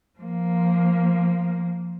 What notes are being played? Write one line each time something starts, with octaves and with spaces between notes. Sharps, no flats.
F3 A#3